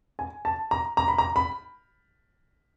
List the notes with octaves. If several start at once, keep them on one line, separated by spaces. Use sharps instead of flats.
G#5
A5
A#5
A#5
B5
A#5
B5